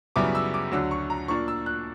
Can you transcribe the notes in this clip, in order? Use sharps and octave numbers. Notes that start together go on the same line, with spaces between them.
F#2 C#3 G3 B3 E4 D6
E6
D6
D2 D3 F#3 E6
C#6
A#5
A#2 A#3 D4 C#6
E6
F#6